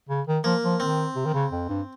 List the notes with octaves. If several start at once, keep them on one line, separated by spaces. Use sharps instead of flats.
C#3
D#3
F3 A#3
F3
D#3 C4
C3
D#3
C#3
F2
G2